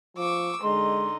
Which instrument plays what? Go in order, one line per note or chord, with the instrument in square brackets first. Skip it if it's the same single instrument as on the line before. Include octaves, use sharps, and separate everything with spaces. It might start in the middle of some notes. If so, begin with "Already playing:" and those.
[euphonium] F3 [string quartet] C#6 D6 E6
[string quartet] D3 D#4 [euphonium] G#3 [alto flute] C6